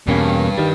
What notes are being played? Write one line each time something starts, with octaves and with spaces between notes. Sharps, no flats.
E2 G2 B2 A#3 C#4
D#3 G3